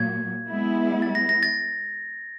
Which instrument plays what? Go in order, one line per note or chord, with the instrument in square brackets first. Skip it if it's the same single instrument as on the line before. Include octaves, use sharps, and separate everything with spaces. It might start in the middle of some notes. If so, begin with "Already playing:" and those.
Already playing: [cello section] A#2 F#3 A#3 [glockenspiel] G#6
[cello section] G#3 B3 E4
[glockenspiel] A6
A#6
A#6
A6